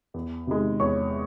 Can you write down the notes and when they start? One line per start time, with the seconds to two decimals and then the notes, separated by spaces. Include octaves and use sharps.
0.14 E2
0.47 C3 D#3 G#3
0.80 E2 C#5 C#6